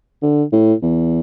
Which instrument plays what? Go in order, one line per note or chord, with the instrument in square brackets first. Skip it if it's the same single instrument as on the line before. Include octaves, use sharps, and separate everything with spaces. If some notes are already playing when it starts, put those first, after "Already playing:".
[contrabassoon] D3
A2
E2